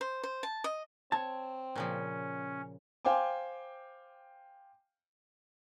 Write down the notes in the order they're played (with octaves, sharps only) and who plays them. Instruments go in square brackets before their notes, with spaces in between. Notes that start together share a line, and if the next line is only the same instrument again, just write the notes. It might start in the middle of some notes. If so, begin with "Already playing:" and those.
[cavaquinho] C5
C5
A5
D#5
[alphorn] C4 [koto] C#5 [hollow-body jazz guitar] A5
[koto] A#2 C#3 F3 [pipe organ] C#4
[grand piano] C5 F5 G5 G#5 D6